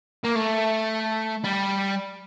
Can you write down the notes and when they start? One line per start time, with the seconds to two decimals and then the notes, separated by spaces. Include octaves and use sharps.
0.24 A#3
0.35 A3
1.44 G3